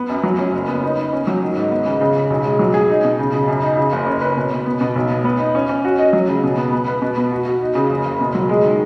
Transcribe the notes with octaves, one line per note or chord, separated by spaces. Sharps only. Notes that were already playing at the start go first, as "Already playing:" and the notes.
Already playing: B3
F#2
F#3
C#4
F#1
B3
D#4
D#4
C#4
F#3
D#3
G#2
B3
C#3
C#3
C#3
B1
G#3
F#3
G#4
D#4
B2
C#3
C#3
F#2
D#4
C#3
F#1
C#4
B4
B2
B2
B3
B2
B1
B3
B3
D#4
C#4
C#4
F#4
D#5
F#3
C#3
B2
B3
B3
B4
B2
B3
F#4
F#4
D#4
C#3
F#1
F#1
B2
F#3
G#3
D#3